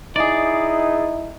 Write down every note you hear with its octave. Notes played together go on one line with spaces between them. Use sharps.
D#4 E4 G#4 D5